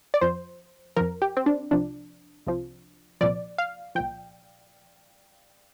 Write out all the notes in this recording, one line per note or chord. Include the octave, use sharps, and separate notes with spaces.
D5
F2 F3 C5
F2 F3 A#4
G4
C4
D4
C2 C3 F3 D4
C2 C3 F3
C2 A#2 F3 D5
F5
C2 A#2 F3 G5